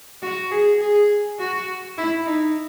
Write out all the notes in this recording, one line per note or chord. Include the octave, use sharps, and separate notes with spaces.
F#4
G#4
G#4
F#4
E4
D#4